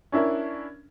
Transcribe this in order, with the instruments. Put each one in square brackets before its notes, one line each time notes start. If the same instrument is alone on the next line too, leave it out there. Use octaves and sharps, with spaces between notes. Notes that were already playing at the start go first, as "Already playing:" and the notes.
[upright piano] C#4 D4 E4 A#4